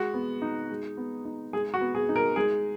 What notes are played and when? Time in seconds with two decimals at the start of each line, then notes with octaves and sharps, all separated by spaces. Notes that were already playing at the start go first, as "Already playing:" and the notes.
Already playing: G#3 F#4
0.14 B3
0.42 D#4
0.71 G#3
0.97 B3
1.25 D#4
1.53 G#3 G#4
1.74 F#4
1.81 B3
1.95 G#4
2.09 D#4
2.16 A#4
2.36 G#3 G#4